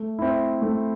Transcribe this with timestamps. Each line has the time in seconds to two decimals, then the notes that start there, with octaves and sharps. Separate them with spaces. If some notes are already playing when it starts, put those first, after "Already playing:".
Already playing: A3
0.19 C4 E4
0.62 A3